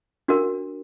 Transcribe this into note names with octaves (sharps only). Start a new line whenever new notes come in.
D4 F#4 A#4